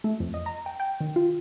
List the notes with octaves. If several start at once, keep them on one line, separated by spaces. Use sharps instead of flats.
A3
F2
D#5
A#5
G5
G5
D#3
F4